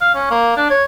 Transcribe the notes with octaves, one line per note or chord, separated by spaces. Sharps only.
F5
C#4
A#3
D4
C#5